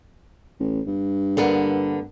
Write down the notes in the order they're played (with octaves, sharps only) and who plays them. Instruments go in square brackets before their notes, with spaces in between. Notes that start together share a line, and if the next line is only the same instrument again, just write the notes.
[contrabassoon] A1
G2
[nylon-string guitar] D3 A#3 B3